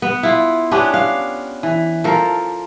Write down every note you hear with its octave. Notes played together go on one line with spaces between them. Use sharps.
B3
E4 F4
B3 C#4 D4 G4
F5
E3
F3 A4 A#4